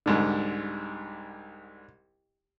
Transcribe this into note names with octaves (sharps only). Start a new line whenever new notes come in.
C2 G#2 D3